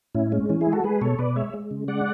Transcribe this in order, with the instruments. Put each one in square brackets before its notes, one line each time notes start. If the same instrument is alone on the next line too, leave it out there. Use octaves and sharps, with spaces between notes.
[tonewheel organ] A2 C#4 E4
G#3 C#4
E3 C#4
E4 G#4
G#3
F#4 A4
G#3 G#4 B4
B2 A4 C#5
B2 B4 D5
G#3 C#5 E5
G#3
C#3
G#3 D5 F#5